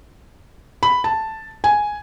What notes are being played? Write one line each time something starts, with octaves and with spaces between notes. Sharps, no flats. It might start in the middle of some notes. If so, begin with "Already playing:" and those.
B5
A5
G#5